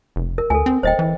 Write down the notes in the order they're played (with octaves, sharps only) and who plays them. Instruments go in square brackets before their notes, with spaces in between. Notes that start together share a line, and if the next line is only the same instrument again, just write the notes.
[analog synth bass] F1
[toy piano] A#4
[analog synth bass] D2 [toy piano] A4 G#5
[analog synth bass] C4
[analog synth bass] D#1 [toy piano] C5 D#5 G5
[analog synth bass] E3